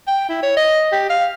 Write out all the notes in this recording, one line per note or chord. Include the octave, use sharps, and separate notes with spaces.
G5
E4
C#5
D#5
G4
F5